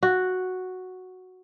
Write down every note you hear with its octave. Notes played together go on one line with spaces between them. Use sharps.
F#4